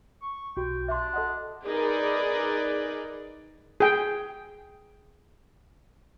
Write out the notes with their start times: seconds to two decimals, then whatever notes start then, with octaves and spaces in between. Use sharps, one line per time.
0.22 C#6
0.57 B1 F#4 G4 G5
0.88 D4 E5 C6
1.14 A4 D#5 F#5
1.65 D#4 G#4 A#4 B4 D5
3.80 G#4 G5